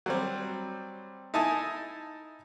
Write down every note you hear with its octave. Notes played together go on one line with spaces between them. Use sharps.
F#3 G3 C4
D#4 E4 G#5 A5 D#6